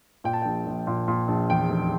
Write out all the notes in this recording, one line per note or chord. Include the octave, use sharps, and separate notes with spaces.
A#2 G5
A5
A#1 G5
A#1
A#2
A#2
A#1
E2 G5
F1